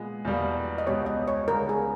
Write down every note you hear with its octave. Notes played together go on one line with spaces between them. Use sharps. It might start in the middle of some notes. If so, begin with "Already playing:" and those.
Already playing: A#2 G#3 B3
E2 B2 G3 A#3
D#5
C#2 B2 G3 B3 G4 C#5
D#5
C#5
C#2 C#3 G3 B3 D#4 A#4
G#4